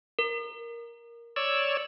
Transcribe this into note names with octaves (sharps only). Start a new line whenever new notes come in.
A#4
C#5 D5 E6